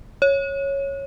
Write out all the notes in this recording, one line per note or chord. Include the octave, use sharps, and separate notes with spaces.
C#5